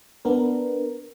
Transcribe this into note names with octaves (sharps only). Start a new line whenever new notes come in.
B3 D4 A#4